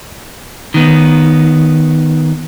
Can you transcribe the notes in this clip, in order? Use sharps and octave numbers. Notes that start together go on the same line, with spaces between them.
D#3 B3